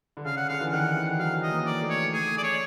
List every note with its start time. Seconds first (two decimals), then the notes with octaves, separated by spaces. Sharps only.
0.17 D3
0.25 C#3 F5
0.37 F#5
0.49 D3 F5
0.61 E3
0.72 D#3 F#5
0.96 E3
1.19 F#3 F5
1.43 D#5
1.50 A#3
1.66 D5
1.81 A3
1.90 C#5
2.12 A3 G#4
2.38 D5
2.43 C#5